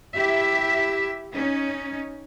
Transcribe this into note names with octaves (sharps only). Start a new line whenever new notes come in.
E4 G4 E5
C#4 D#4